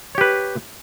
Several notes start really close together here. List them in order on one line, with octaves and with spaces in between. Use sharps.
C#5 G4 B4